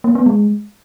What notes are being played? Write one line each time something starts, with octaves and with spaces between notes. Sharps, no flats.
A#3
B3
G#3